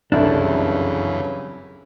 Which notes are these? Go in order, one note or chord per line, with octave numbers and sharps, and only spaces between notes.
G1 C2 F#2 C#3 E3 D4 A4